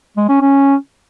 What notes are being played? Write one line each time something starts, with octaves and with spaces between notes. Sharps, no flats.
G#3
C#4
C#4